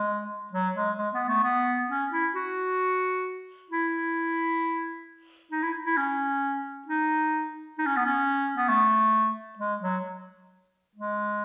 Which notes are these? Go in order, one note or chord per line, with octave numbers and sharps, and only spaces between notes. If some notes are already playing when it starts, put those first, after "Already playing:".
Already playing: G#3
F#3
G#3
G#3
B3
A3
B3
C#4
E4
F#4
E4
D#4
E4
E4
C#4
D#4
D#4
C#4
B3
C#4
B3
A3
G#3
F#3
G#3